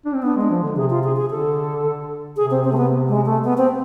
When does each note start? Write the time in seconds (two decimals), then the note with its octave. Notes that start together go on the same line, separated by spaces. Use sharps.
0.05 D4
0.14 C4
0.23 B3 D4
0.36 G#3
0.41 D4
0.50 F3
0.63 D3
0.76 C3 G#4
0.90 F4
1.04 G#4
1.16 G#4
1.30 D3 A4
2.36 C3 G#4
2.51 C4
2.64 C4
2.72 A3
2.77 B3
3.09 G#3
3.26 A3
3.44 B3
3.58 C4